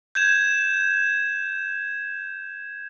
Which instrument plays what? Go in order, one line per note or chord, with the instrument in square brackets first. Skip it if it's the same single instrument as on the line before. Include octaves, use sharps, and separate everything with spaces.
[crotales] G6 G#6 E7